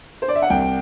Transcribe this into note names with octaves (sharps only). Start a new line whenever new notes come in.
C5
D5
E5
F#5
C2 G5